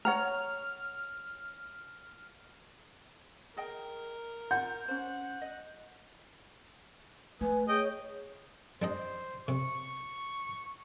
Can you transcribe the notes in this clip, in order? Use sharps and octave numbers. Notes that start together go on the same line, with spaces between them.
C#5 F#5 A#5 F6
G#4 A#4 D#5 G5
F4 F#5 G6
C#4 C5 F#5
D#5
A3 B4 G#5
G#4 C#5 D#5 G5
G3 D4 C5 D#5
C3 C#6